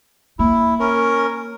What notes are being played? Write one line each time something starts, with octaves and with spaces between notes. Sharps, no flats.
A#3 E4
C#4 A#4